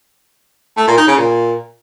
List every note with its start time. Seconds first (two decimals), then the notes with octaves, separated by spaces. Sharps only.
0.77 A3
0.87 A#2
0.98 D#4
1.08 C#3
1.18 A#2